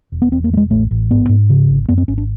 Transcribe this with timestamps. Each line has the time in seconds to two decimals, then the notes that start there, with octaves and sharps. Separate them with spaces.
0.12 E1
0.22 B3
0.32 E2 C4
0.44 A#3
0.51 E1 A3
0.57 G#3
0.70 A1 A3
0.91 A1
1.11 G#2 B3
1.29 G#2
1.49 C#3
1.69 G#1
1.89 F#2 B3
1.98 C4
2.08 G#1 C#4
2.18 D4